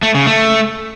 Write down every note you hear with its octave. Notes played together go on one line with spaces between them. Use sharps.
A3
C#3
A3